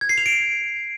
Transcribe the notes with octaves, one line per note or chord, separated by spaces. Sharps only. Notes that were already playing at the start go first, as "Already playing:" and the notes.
G#6
C7
F7
D7